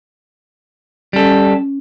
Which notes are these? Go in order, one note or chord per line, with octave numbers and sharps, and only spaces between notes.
G3 C#4 A4